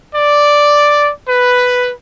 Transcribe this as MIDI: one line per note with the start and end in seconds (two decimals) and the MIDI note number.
0.15 1.10 74
1.27 1.91 71